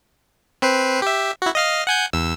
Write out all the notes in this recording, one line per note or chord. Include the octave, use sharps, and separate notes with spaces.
C4 B4 C5
G4 E5
E4 F#4
D#5 F5 F6
F#5 G#5 G6
E2 E6